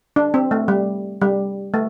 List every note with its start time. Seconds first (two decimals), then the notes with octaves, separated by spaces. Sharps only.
0.16 D4
0.34 C4
0.51 A3
0.68 G3
1.21 G3
1.74 A3